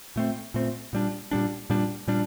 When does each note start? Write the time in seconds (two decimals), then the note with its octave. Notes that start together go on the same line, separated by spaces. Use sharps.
0.16 A#2 A3 C4
0.54 A#2 A3 C4
0.93 A#2 G3 D4
1.31 A#2 G3 D4
1.70 A#2 G3 D4
2.07 A#2 G3 D4